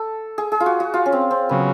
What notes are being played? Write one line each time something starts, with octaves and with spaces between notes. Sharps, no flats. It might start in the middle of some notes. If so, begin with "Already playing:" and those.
Already playing: A4
G#4
G#4
F4
F#4
F#4
F4
C#4
C4
C4
C#3 F#3 B3